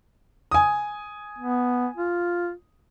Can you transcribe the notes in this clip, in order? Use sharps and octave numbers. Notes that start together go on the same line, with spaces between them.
G#5 D#6
B3
F4